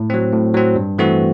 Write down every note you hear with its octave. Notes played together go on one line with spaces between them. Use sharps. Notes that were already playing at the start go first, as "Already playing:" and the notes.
Already playing: A2
F#3 C4
A2
F#3 C4
G2
E3 A3 C4 F#4